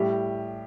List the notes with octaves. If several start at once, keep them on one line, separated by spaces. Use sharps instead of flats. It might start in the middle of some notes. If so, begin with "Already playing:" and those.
Already playing: A2 G3 G4